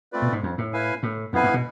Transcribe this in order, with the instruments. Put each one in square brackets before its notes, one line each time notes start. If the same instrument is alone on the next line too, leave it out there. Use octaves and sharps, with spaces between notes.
[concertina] A3 C4 F4 B4 D5
[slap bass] B2
G#2
F2
A2
[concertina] E4 B4 F5 G#5
[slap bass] A2
[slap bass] F2 [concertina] B3 E4 B4 F5 G#5
[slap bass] G#2
B2